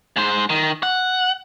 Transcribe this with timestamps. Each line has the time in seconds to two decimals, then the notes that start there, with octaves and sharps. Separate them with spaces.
0.16 G#2 C5
0.50 D#3
0.83 F#5